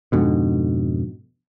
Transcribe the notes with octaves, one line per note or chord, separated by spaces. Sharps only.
F2 G#2 B2 D3